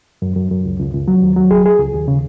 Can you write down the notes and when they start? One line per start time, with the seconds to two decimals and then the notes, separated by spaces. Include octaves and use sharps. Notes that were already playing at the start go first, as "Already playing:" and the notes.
0.22 F#2
0.36 F#2
0.51 F#2
0.65 C#2
0.80 C#2
0.94 C#2
1.08 F#3
1.22 D#2
1.36 F#3
1.51 G#4
1.66 G#4
1.79 C#2
1.94 D#2
2.08 C#3